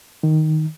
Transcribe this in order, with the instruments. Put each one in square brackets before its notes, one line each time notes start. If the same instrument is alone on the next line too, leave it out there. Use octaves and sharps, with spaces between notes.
[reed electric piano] D#3